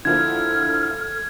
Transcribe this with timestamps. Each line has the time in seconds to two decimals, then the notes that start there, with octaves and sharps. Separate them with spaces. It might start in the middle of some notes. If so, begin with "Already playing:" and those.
0.05 D3 F3 A#3 E4 A4 F6 G#6